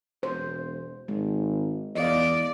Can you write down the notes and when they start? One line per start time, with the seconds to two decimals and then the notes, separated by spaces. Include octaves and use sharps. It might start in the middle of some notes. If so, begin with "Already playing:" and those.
0.23 E1 C5
1.08 G#1 G#3
1.95 E2 D5 D#5 F5